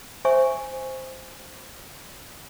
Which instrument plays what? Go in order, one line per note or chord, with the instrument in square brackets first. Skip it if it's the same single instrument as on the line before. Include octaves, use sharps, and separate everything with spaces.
[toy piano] C5 C#5 E5 G#5 C#6